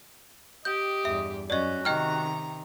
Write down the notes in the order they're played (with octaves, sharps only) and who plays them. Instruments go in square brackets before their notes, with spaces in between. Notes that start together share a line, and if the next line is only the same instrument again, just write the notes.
[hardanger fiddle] G4 [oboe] D#5 [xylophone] G6
[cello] E2 G2 [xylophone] E5
[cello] F#2 [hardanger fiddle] C#4 [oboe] F#4 [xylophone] D5 D#5
[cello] C3 D#3 [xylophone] D#5 G5 F6 [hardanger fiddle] A#5